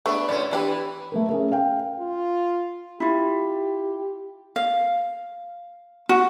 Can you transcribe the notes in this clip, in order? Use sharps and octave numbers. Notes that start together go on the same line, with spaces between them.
A3 B3 D4 B4
F#2 A2 C#4 D5
E3 F#3 D4 G4 B4
A3 B3 A#4
C#4 G#4 A#4 E5
F5 G5
F4
E4 F4 G4
F5
F#4